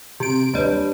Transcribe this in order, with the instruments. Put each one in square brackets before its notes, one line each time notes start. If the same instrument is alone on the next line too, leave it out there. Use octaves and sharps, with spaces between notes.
[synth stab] C3 D7
[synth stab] D#2 G3 [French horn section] D4 B4 C#5